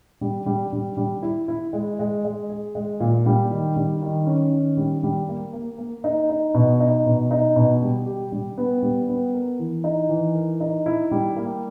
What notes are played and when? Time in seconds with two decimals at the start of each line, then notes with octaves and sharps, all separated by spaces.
0.21 G3
0.46 G3
0.73 G3
0.97 G3
1.22 E4
1.48 E4
1.73 G#3
1.99 G#3
2.25 G#3
2.49 G#4
2.75 G#3
3.00 A#2
3.26 G3
3.50 D#3
3.76 G3
4.02 D#3
4.26 C#4
4.52 D#3
4.77 G3
5.03 G3
5.29 A#3
5.54 A#3
5.78 A#3
6.04 D#4
6.30 D#4
6.54 B2
6.80 D#4
7.06 B2
7.31 D#4
7.56 B2
7.82 G3
8.06 G4
8.32 G3
8.58 B3
8.82 G3
9.09 B3
9.34 A#4
9.59 E3
9.84 D#4
10.09 E3
10.35 A#4
10.60 D#4
10.86 E4
11.11 G3
11.36 A#3